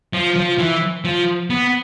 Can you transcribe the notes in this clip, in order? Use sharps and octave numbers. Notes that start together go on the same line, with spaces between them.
F3
F3
E3
F3
B3